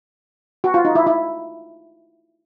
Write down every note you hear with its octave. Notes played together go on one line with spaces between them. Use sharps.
F#4
F4
D#4
E4
E4